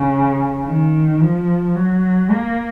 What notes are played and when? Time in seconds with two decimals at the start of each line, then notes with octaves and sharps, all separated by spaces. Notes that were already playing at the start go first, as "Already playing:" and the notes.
Already playing: C#3
0.66 D#3
1.21 F3
1.75 F#3
2.30 A#3